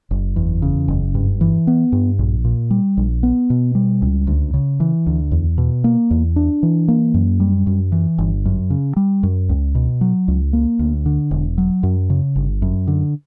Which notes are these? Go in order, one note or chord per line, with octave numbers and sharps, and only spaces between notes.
F#1
E2
C#3
F#1
G2
E3
B3
G2
A#1
A#2
G3
A#1
B3
B2
G3
C#2
D2
C#3
E3
D2
E2
B2
A#3
E2
D4
E3
A#3
F#2
G3
F#2
E3
G1
F#2
C#3
G3
F#2
C#2
B2
F#3
C#2
A#3
D2
D3
E1
F#3
F#2
C#3
G1
F#2
D3